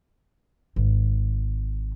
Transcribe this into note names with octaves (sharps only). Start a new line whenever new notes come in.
G#1